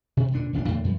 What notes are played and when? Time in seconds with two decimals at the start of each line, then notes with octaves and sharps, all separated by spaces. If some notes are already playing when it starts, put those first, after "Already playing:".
0.17 B2
0.32 E1 A#2 D3 D4
0.53 D#1 A1 C#4 D4
0.68 E2 A2 D3 A#3
0.84 F#2 F3